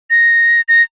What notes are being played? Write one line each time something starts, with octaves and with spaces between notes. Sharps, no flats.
A#6
A#6